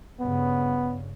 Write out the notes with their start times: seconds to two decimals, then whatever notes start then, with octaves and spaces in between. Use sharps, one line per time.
0.20 G2 C#3 B3